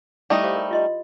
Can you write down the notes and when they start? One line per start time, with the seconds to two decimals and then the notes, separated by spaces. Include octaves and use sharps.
0.30 G3 A3 D#4 E4 G4 D#6
0.44 G4 C5 F5
0.56 A#4
0.71 F4 D#5 C6